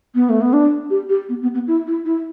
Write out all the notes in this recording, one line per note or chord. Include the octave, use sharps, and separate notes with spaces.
B3
A3
B3
D4
G4
G4
B3
B3
B3
E4
E4
E4